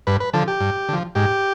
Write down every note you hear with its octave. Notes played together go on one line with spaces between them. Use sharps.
G2 B4
B4
D3 F3 A4
G4
G2
D3 F3
G#2 G4